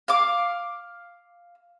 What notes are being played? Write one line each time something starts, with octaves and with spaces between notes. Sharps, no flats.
F5 D6